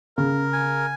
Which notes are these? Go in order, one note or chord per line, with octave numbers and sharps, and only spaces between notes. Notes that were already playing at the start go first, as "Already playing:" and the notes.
C#3 A#4
G#5